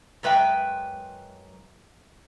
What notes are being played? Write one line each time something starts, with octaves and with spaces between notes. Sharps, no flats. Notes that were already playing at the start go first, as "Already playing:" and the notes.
F#2 G#3 B4 E5 G5